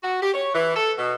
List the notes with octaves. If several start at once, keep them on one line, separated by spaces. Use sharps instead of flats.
F#4
G4
C#5
E3
A4
B2